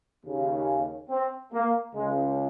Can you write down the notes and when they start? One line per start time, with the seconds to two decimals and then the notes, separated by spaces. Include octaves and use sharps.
0.25 D#2 C#3
1.09 C4
1.53 A#3
1.94 C#2 C#3 G#3